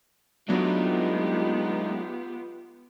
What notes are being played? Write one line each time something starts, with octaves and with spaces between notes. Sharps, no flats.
F#3 G#3 A3 B3 D4 D#4 F4 G4